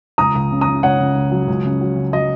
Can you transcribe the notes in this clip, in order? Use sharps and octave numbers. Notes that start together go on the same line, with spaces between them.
C#2 A#5 D#6
C#2
C#3
A#5 D#6
C#3
C#2 C#5 F#5
C#3
C#2
F#3
C#2
C#3
F#3
C#3
F#3 D#5